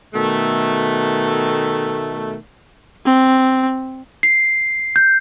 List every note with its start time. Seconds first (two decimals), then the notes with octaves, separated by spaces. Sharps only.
0.14 B2 D#3 A3
3.06 C4
4.23 C7
4.96 G6